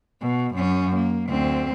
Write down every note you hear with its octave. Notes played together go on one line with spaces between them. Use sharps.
B2
F#2 C#4
A#3
D2 C4